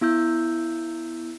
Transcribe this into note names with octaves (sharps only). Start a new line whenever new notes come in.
B3 E4 E6 G6